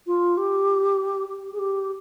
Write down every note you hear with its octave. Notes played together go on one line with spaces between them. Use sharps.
F4
G4
G4
G#4
G4